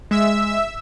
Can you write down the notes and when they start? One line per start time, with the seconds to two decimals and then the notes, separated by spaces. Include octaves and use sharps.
0.11 G#3 E5 E6